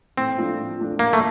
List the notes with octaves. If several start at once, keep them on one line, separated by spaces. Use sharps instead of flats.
A2 C4
F3 A3 D4 F4
A2
F3 A3 D4 F4
A2 A#3
A3